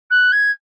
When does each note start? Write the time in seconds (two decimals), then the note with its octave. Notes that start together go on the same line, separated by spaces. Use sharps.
0.10 F#6
0.32 G#6